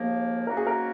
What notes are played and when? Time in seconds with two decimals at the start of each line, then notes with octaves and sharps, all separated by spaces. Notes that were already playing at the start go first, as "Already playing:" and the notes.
Already playing: D#2 C#3 F3 A#3
0.47 G#2 F#3 A#3 C#4 F#4 A#4
0.57 G#4
0.67 A#4